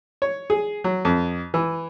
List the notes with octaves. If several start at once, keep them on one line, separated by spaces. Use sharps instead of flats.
C#5
G#4
F#3
F2
E3